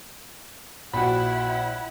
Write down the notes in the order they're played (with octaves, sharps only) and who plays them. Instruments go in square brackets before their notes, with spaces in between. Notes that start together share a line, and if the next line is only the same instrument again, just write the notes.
[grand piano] A#1 G5 [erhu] E4 [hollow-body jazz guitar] F#4 B5 [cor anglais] F#5